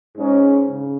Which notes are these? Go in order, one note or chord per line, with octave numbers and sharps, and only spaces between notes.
G#2 G#3 C#4
C#3